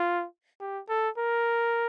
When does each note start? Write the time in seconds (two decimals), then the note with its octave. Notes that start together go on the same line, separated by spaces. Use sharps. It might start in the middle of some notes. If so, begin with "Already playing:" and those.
Already playing: F4
0.60 G4
0.89 A4
1.18 A#4